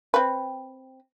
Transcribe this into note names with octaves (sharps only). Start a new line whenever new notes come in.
C4 B4